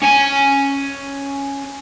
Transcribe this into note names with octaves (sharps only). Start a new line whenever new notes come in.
C#4 G#5